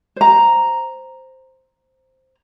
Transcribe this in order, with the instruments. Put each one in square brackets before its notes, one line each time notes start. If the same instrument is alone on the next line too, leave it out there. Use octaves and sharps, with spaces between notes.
[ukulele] C5 A#5